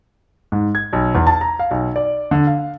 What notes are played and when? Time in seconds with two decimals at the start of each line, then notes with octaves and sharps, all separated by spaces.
0.52 G#2
0.75 G#6
0.93 B1
1.15 E2
1.27 A5
1.41 A#5
1.59 F5
1.71 B1
1.96 D5
2.31 D3
2.47 F5